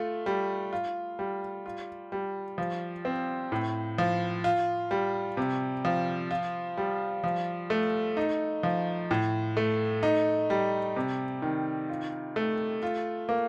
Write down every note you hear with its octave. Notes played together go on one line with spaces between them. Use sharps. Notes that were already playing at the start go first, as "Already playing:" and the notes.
Already playing: A3 F4
G3
F4
G3
F4
G3
F3
C4
A2
F3
F4
G3
C3
F3
F4
G3
F3
A3
D#4
F3
A2
A3
D#4
G3
C3
D#3
F4
A3
F4
A#3